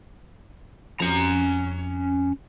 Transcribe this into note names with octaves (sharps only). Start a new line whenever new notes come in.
F2 C#4 A#5